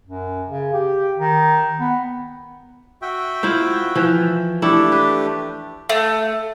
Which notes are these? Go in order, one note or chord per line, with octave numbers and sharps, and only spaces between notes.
F#2
C#3
G4
D#3
B3
F#4 E5 G5
E4 F4 C5
E3 F3
A3 D4 E4 G4 A4
B4
A3